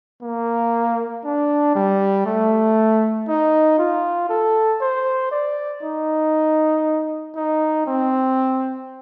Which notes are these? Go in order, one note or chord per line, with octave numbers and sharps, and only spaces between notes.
A#3
D4
G3
A3
D#4
F4
A4
C5
D5
D#4
D#4
C4